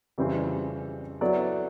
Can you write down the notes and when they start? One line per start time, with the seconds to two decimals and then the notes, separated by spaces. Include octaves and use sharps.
0.18 F2 C#3 E3 G3 C4
1.21 F#3 B3 E4 A4 D5